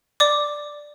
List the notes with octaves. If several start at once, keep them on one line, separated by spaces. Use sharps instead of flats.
D5 D6